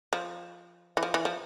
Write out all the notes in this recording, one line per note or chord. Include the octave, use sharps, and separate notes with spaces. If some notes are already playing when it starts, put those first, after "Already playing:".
F3
E3
F3
E3
F3